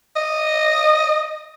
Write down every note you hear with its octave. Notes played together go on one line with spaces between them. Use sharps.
D#5